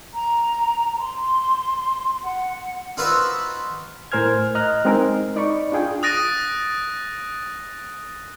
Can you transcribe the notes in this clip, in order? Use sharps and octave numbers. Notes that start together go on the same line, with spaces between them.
A#5
C6
F#5
D#4 F4 F#4 B4 C5 E5
A2 A#4 C5 G#5 F6 G#6
D#5 A#5 F6 F#6
G#3 C4 D#4 G#4 A#4
D#4 D5 B5 C#6
D4 F4 G#4 G5
D#6 F#6 A6 A#6 D7 D#7